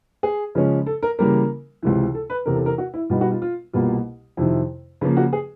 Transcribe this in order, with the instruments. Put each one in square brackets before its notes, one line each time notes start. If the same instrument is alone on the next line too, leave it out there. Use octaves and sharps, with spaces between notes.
[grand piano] G#4
C#3 F3 G#3 C#4
A4
A#4
C#3 E3 G3 A#3 A#4
C#2 C3 E3
A4
B4
E2 C3 E3 A#4
A4
A#4
F#4
E4
B2 G3 B3 D#4 F4
F#4
F4
F4
C2 B2 G3 A#3 F4
F2 C3 D#3 E4
C#3 F3 A#3 F4
F#4
G#4